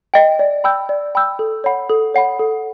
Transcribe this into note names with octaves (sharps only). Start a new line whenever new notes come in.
D#5 G5
D5
G5 B5 E6 G6
D5
G5 B5 E6 G6
A4
C#5 F#5 B5
A4
C#5 F#5 B5
A4